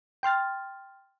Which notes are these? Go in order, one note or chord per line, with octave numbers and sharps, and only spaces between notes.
G5 C6 F6 A6